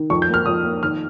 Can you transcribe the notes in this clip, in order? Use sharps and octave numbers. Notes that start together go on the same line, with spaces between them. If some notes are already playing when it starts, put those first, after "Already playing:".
Already playing: D#3
F2 C#6
G6
A#3 F6
F2 D#6
A#3
D#3 F6